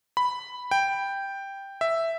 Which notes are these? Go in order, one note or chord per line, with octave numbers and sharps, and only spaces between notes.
B5
G5
E5